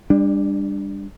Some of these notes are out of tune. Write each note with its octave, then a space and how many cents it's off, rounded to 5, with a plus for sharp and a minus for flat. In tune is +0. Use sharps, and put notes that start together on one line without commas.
G3 +30 D4 +0